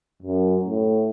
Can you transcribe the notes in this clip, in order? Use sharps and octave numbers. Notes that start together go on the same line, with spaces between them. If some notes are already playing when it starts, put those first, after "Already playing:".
F#2
A2